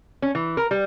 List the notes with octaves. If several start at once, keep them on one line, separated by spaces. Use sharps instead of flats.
C#4
E3
A#4
G3